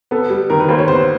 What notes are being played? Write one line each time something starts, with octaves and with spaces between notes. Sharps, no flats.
B3 A4
G3
D#3 A#4
B4
D#2 C5
C#5
B3 C5